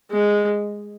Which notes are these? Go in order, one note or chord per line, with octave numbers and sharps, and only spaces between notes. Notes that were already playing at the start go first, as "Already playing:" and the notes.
G#3